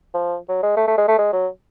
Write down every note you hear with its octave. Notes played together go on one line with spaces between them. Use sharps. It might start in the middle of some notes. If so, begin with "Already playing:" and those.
F3
F#3
G#3
A3
A3
G#3
A3
G#3
F#3